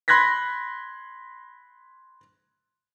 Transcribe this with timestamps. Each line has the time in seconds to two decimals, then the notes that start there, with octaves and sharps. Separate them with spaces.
0.08 B5 C6 F#6 G#6 A#6 B6